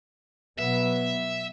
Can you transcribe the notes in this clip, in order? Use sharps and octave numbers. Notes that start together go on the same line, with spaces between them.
B2 F#3 B3 E5